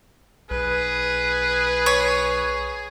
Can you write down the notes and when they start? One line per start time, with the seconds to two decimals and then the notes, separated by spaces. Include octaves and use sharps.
0.50 B1 G#4 B4
1.86 C#5